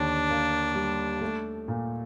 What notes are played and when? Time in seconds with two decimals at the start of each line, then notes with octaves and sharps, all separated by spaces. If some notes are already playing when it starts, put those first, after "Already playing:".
Already playing: D#2 D3 D4
0.30 A#3
0.75 G3
1.21 A3
1.68 A#2